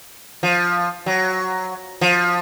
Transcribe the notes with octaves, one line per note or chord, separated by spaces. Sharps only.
F3
F#3
F3